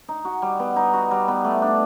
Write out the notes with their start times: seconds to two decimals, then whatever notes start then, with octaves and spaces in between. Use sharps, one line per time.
0.09 D#4
0.25 F#4
0.42 G3
0.60 B3
0.76 D#4
0.93 F#4
1.11 G3
1.28 B3
1.45 A3
1.62 D4